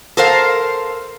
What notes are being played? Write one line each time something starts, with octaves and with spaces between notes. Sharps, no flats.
A4 A#4 C5 F5